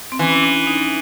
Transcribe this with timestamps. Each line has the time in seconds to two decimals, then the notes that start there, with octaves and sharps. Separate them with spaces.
0.12 C4
0.19 E3 C#4
0.43 D4
0.67 D#4